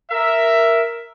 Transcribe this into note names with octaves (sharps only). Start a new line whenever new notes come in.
A#4 E5